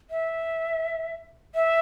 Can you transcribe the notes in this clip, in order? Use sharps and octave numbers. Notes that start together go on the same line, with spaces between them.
E5
E5